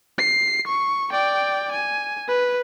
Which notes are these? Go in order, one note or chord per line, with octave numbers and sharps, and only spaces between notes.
C7
C#6
D5 G5
G#5
B4